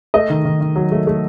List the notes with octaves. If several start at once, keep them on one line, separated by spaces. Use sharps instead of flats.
A3 D#5
D#3
D#3
D#3
F#3
A3
A3